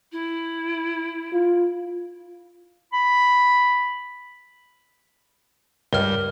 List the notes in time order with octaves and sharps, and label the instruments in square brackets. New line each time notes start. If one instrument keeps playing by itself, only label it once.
[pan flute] E4
[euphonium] F4
[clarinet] B5
[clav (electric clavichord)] C#2 [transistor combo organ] G2 [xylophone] A#4 F6